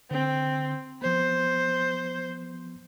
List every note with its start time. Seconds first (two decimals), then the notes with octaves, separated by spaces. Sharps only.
0.11 D3 C4
1.02 F3 B3 C5